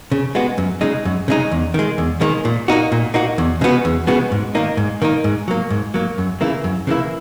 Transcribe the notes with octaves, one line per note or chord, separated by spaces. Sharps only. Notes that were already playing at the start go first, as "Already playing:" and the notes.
C#3
G#3 B3 F#4
F#2
C#3 G#3 D#4
F#2
C#3 G#3 D#4
E2
D#3 G#3
E2
D#3 G#3
A#2
A#3 D#4 F#4
A#2
A#3 D#4 F#4
E2
C#3 G#3 B3 F#4
E2
C#3 G#3 B3 F#4
G#2
D#3 A#3 D#4
G#2
D#3 A#3 D#4
G#2
F#3 A#3
G#2
F#3 A#3
F#2
C#3 E3 A#3 E4
F#2
C#3 E3 A#3 E4